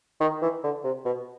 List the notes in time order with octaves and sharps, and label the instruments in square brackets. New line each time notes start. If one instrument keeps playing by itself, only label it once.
[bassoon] D#3
E3
D3
C3
B2